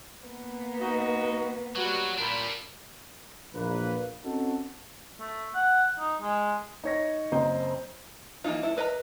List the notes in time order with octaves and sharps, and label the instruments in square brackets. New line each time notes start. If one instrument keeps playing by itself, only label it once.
[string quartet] A#3 B3
[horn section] D#4 F#4
[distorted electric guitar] F#3 [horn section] G3 F#4
[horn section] A#2 B5 [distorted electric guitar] G3 D4
[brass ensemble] A#1 E2 A#3 B4
C4 C#4 D#4 F#4 A4
[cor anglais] A3
F#5
D#4
G#3
[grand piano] D#4 C#5 A#6
F#1 C4 C5 D#5 A#5
[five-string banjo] E3 A#3 D#4 F4
A3 E4
A#4 B4 D#5 G#5 A#5